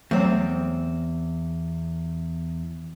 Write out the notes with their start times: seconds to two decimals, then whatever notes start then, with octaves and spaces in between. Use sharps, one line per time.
0.11 E2 F#3 A3 C4